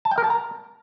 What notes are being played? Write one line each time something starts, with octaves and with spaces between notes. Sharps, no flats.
A5
G5
A#4
A5
A#5